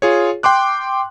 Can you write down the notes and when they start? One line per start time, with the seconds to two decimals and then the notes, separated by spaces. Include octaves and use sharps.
0.02 F4 G#4 C#5
0.43 G5 C6 D6 F#6